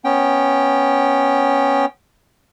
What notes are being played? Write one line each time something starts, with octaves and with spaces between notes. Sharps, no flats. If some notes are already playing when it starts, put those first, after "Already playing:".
B3 C#4 G5